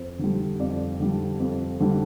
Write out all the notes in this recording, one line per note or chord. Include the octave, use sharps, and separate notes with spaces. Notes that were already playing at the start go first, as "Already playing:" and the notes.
Already playing: F2 C5
D3 G3
F2 D5
D3 G3
F2
D3 G3